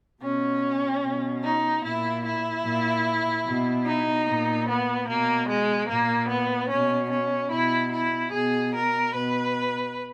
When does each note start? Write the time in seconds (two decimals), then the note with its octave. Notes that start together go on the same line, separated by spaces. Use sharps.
0.21 B2 C#4
1.02 B2
1.42 D#4
1.83 A#2 E4
2.24 E4
2.64 A#2
3.45 B2
3.86 D#4
4.27 A#2
4.68 B3
5.07 B2 A#3
5.48 G#3
5.88 A#2 A#3
6.29 B3
6.69 B2 C#4
7.10 C#4
7.51 B2 E4
7.92 E4
8.32 B2 G#4
8.73 A#4
9.13 B2 B4